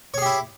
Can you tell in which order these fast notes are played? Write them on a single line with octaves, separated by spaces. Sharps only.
C#5 G#4 G4 E4